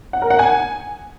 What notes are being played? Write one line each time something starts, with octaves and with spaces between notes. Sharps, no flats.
F#5
A#4
F#5
G#5